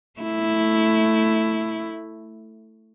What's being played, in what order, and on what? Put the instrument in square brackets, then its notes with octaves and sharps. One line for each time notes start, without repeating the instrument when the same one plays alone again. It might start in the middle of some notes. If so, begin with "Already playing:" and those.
[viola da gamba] A3 E4